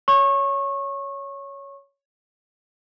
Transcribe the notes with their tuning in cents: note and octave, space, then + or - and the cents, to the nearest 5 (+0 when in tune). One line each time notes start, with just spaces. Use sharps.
C#5 +10 C#6 -25